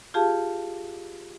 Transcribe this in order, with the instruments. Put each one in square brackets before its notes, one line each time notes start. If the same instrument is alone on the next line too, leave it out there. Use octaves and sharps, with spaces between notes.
[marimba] F4 G4 G#4 F5 A5